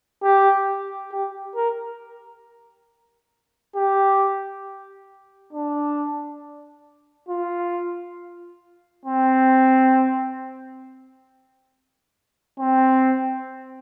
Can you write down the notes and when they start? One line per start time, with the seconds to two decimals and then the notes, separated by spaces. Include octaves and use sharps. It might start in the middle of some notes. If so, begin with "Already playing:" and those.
0.23 G4
1.12 G4
1.56 A#4
3.76 G4
5.53 D4
7.29 F4
9.05 C4
12.59 C4